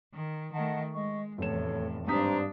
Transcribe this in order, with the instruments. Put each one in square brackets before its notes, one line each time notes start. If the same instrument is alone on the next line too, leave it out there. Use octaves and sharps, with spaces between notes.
[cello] D#3
[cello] D#3 A3 [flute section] D#5 F#5 A5
[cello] G#3 [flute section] D#5 C#6
[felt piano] F1 E7 [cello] E2 A2 [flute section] A4 C#5
[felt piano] G#1 D#6 B6 [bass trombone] G2 [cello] D4 [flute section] C5 A#5